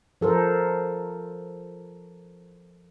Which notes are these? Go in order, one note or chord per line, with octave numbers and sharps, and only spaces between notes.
F3 A4 A#4 C5